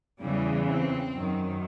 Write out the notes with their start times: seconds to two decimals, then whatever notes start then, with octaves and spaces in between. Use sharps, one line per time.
0.21 E2 C#3 E3 G3
0.68 C4
1.14 F#2 D#3